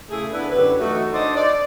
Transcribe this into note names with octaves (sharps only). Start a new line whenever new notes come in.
C#3 A3 E4 G#4
B3 D4 E4 B4
F#2 D3 F#3 G4 B4
E3 A3 D#4 F#4
D4 D#4 A4 C5 D5 D#5
D5